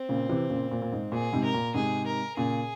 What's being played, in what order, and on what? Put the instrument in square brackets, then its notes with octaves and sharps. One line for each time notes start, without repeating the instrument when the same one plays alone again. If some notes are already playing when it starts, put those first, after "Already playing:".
Already playing: [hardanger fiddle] C4
[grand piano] A#2 C#3
C3 E3
A#2 C#3
A#2
A#2
G#2
[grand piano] A#2 [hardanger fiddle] G#4
[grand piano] G#2 C3
[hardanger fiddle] A#4
[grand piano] A#2
[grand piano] G#2 C3 [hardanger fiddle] G#4
[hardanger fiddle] A#4
[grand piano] A#2 C#3 [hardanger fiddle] G#4